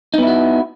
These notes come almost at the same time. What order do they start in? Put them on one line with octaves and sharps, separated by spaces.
D#4 B3 E4 F#4